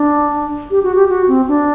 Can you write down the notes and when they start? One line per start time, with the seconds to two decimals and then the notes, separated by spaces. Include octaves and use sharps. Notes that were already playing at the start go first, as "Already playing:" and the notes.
Already playing: D4
0.71 G4
0.83 F#4
0.96 G4
1.09 F#4
1.28 C4
1.48 D4